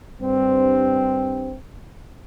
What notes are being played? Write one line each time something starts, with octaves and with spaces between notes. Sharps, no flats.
G2 C4